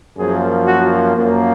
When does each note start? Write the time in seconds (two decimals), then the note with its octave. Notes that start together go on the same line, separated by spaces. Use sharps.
0.17 F#2 F3 A#3 G#4
0.66 F#4
1.16 F#2 F3 A#3